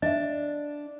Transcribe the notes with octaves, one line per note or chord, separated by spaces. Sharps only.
D4 D#5 E5